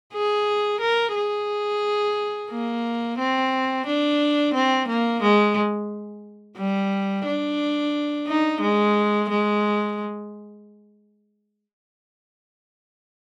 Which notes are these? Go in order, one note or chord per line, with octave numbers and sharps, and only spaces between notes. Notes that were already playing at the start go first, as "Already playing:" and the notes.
G#4
A#4
G#4
A#3
C4
D4
C4
A#3
G#3
G3
D4
D#4
G#3
G#3